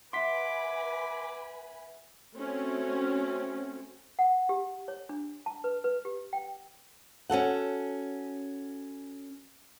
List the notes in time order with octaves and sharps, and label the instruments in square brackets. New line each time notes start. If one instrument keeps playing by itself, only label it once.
[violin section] B4 G#5 B5 [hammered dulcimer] E5 F#5 [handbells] C6 B6 [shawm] D6
[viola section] A3 C4 C#4 F#4
[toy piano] F#5
G4
C#5
D4
A5
B4
B4
G4
G5
[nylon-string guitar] C#4 F#4 A4 F#5